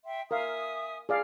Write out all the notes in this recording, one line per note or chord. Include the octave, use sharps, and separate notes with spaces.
E5 G5 C6
A#4 E5 F5 G#5 D#6
G#4 D5 F5